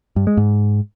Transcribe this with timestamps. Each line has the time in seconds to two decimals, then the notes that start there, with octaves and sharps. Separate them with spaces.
0.16 G2
0.27 G#3
0.37 G#2